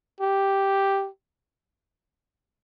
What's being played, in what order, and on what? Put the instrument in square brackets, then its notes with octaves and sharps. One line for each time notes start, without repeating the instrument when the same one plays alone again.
[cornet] G4